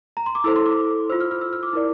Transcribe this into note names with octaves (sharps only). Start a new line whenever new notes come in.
A#5
C6
D6
E4 A4 C5 E6
C6
D6
F4 C5 E6
F6
F6
E6
F6
D6
E4 A#4 D5